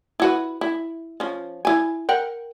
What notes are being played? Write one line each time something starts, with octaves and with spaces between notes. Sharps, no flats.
E4 F#4 B4
E4
F3 C#4
E4 G#5
A#4 F#5 G5